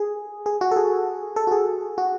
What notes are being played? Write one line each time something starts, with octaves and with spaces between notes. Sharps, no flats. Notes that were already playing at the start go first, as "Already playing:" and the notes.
Already playing: G#4
G#4
F#4
A4
G#4
A4
F#4
G#4
F#4